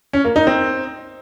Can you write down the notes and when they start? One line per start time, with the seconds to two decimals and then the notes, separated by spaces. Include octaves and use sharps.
0.13 C#4
0.25 A#3
0.36 D#4
0.47 C4